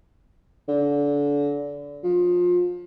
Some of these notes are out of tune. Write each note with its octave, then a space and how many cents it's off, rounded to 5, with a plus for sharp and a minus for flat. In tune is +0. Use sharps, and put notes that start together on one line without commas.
D3 -30
F3 +25